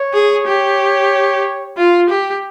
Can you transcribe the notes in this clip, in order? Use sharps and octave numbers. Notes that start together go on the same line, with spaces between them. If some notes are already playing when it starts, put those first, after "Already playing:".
Already playing: C#5
G#4
G4
F4
G4